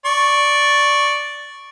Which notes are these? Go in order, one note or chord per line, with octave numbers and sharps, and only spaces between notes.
D5 C#6